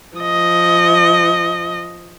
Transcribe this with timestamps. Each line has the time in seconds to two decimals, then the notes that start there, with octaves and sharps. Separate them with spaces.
0.17 F3 D#5